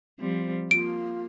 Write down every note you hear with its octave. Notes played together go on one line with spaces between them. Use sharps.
F3 G3 C4
A#3 F4 D7